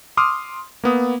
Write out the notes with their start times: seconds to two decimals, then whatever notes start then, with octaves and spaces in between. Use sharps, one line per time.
0.17 C6 D6 D#6 F6
0.84 A#3 B3 D#6